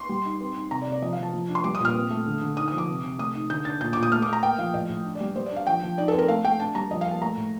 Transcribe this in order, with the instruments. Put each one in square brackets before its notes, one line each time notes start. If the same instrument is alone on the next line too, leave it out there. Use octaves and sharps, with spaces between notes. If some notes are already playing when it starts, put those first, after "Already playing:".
Already playing: [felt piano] C6
G3
D#4
C4
D#4
C3 A#5
D5
C3
D5
F3 D#5
F5
F3
A5
F3
D4
C6
G3 D6
D#6
A#2 F6
C4
A3
D3
D3
D#4 D#6
D#6
F3
D6
C3
C3
A3 D#6
D#4
D3 G6
D4 A6
A#2 G6
A#2 D6
D#6
A3 F6
D6
A3
A#5
A#3 G5
F3 F5
A2 D#5
A2
D4
D5
G3
G3 C5
D5
D4
F5
F3 G5
F3
D#4 D5
A4
C4
A#4
A3 F5
A3 G5
D4 A5
G3 A#5
F3 D#5
F5
A#3 A5
A3 A#5
A2